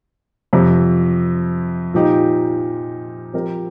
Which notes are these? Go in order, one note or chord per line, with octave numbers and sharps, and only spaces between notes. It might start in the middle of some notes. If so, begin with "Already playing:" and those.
F2 C3 F3
A#2 F3 D#4 G4
F3 C4 G4 A#4